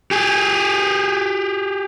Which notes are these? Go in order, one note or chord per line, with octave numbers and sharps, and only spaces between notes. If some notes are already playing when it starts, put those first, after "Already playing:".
G4 G#4